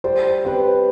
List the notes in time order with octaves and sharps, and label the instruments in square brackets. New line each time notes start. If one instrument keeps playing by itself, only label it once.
[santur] G3 [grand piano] C5
[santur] C4 G4 B4 [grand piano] C5